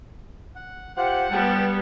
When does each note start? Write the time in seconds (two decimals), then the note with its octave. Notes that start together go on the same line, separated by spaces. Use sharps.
0.55 F#5
0.97 F4 G4 C5 F#5
1.31 G3 B3 G5 A5